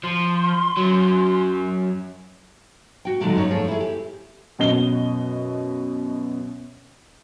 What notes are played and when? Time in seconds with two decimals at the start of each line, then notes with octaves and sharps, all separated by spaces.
0.04 F3 C6
0.77 F#2 F#3
3.05 F#4 G5
3.21 A#2 D3 D#3 F#3 G#3 A3
3.36 F#2 C#4 D#4 C#5
3.51 F3 A3 G#4 C#5
3.68 E4 G#4
3.80 G4
4.59 F#2 B2 D#5 G7